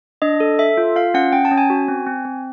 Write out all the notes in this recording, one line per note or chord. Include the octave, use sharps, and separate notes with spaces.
D4 D#5
A4
A4 E5
F4
F4 F5
C#4 F#5
C#4 G5
A5
C#4
G#5
F#4
C4
C4
C4